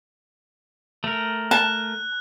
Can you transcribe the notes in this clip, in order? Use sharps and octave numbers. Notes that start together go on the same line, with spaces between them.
A3 A#4
A5 F#6